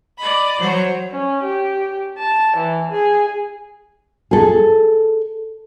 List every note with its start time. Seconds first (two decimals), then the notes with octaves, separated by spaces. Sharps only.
0.18 D5 D#5 B5
0.60 F#3 C5 C#5
1.11 C#4
1.44 G4
2.19 A5
2.57 E3
2.91 G#4
4.31 G#4 A4